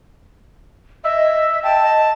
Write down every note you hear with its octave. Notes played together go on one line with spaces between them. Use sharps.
D#5 E5
G5 A5
D#5